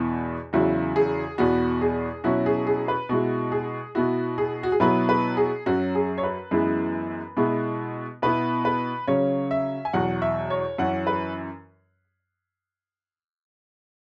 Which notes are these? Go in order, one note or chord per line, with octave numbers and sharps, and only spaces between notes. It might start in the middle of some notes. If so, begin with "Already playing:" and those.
Already playing: E2 B2 B3 E4
E2 C#3 F#3 E4 F#4
G#4
E2 B2 B3 F#4
G#4
B2 F#3 C#4 E4 F#4
G#4
G#4
B4
B2 G#3 E4 F#4
G#4
B2 B3 E4 F#4
G#4
F#4
G#4
B2 F#3 B3 E4 B4
B4
G#4
F#2 F#3 C#4 F#4
G#4
C#5
B4
F#2 E3 G#3 B3 E4
B2 G#3 B3 E4
B2 B3 E4 B4
B4
C#3 F#3 C#4 C#5
E5
G#5
E2 B2 F#3 F#5
E5
C#5
F#2 E3 C#4 F#5
B4